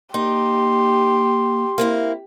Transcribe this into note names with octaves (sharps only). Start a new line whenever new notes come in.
A#3 D#4 G4 C6
A#3 C4 E4